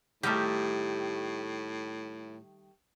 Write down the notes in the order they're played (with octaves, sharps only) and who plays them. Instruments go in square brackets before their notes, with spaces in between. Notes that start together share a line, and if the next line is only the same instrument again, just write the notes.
[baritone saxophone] A2 [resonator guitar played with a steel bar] D#3 G3 A3 [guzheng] G4